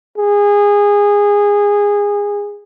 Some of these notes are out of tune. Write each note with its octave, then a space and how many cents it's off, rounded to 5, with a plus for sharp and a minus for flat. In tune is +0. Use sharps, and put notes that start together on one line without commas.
G#4 -20